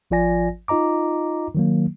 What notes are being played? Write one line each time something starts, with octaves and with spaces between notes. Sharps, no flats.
G#1 F3 F4 D5 G#5 A#6
D#4 F4 D#5 A#5 D6
D#3 F#3 A#3